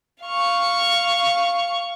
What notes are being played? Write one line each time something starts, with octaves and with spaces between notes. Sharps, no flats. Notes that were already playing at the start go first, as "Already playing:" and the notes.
F5 C#6